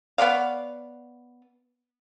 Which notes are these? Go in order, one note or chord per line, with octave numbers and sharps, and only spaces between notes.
B3 C#5 D5 F5